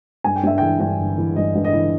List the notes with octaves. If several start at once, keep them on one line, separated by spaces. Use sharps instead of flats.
G2 G#5
G5
G2 E5
E3 G5
G2 G5
G1
E3
G2 D#5
G2
D#5
E3